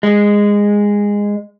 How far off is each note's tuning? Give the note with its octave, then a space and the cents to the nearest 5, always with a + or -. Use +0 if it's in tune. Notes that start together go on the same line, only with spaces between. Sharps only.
G#3 -15